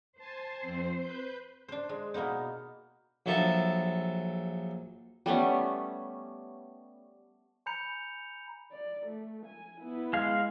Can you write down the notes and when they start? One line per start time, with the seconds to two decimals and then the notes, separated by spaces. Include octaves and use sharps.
0.18 C5 G#5 A5
0.62 F2 C4
0.99 B4 G6
1.68 D4 C5
1.89 G#3
2.14 B2 A#3 B3 D#4
3.26 A#1 F#3 A4 E5 A5
5.26 G3 A3 B3 C#4
7.66 G#5 A#5 B5 G6 C#7 F7
8.72 D5
9.06 A3
9.46 G#5
9.81 B3 E4
10.13 G#3 F5